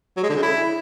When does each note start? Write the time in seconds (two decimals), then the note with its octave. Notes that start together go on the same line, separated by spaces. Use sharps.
0.17 F#3
0.23 G#3
0.29 D3
0.36 C#3
0.42 E4